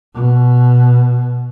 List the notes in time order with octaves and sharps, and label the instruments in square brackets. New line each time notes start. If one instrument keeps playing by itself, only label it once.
[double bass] B2